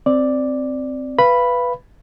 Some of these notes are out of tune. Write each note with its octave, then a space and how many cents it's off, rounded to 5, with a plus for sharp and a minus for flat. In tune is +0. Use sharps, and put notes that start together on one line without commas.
C4 +0 D5 +0
B4 +0 F5 -30 B5 +0